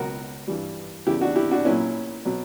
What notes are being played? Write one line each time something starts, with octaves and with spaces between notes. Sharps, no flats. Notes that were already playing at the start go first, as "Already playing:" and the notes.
Already playing: C#2 B2 F#3 F#4 A#4
G2 E3 G3
E2 C#3 G3 E4 G4
D4 F#4
E4 G4
D4 F#4
A#1 A#2 F#3 C#4 E4
B2 F#3